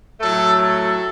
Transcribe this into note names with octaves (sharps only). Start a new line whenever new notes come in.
A2 F#3 A3 A4
A4